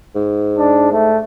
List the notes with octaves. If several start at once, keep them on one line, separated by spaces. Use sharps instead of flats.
G#2
D4
A3